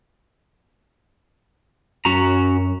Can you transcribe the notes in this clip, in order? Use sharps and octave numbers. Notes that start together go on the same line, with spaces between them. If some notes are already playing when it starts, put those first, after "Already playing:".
F#2 C#4 F#4 A#5